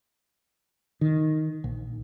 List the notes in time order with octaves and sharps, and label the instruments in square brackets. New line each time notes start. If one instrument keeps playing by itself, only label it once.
[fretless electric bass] D#3
A#1